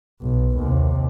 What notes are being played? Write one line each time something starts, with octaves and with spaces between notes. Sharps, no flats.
B1
D#2 C3